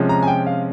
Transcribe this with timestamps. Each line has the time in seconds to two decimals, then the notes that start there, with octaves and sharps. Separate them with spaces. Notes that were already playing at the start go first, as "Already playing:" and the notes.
Already playing: C3 F3 G#3 C#4
0.09 A#5
0.23 G#5
0.27 G5
0.47 F5